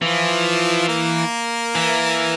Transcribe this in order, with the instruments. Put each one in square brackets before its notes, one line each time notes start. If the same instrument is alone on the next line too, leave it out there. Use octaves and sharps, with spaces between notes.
[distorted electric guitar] E3 [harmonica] F3 F4
[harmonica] A#3 A#4
[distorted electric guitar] E3